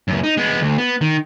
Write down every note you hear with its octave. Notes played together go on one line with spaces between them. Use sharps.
C#2 F#2
D#4
G#3 B3
D2
B3
D#3